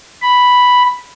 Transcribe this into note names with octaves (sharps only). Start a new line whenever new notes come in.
B5